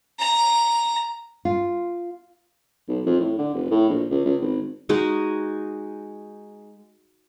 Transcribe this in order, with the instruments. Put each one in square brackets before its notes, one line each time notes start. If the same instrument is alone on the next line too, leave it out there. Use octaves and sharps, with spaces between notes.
[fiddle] A#5
[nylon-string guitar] F4
[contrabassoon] B1
F2
A2
D3
F1
A2
A#1
C#2
C#2
G#1
[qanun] G#3 D#4 F#4 G#4